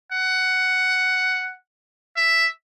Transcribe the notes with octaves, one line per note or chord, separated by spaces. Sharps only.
F#5
E5